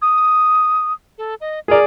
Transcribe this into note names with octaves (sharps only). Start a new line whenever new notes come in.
D#6
A4
D#5
G#4 A#4 D5